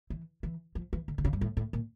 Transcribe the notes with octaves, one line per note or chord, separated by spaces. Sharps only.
E3
E3
F3
E3
D3
D3
C#3
G2
A2
A2
A#2